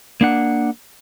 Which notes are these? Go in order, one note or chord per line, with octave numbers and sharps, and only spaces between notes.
A#3 D4 F#5